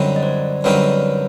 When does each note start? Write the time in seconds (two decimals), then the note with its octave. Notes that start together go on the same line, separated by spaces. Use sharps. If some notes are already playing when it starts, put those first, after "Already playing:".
Already playing: F#2 D3 G3 C4 D#4 C#5
0.16 D#5
0.23 C5 D5
0.64 F#2 D3 G3 C4 D#4 B4 C#5